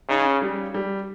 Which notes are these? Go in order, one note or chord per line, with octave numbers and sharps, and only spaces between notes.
C#3 D#4
C#4
G3
G3